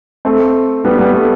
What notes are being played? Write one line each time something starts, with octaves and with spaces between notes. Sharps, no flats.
A3 C4
G3 B3
G3 B3
A3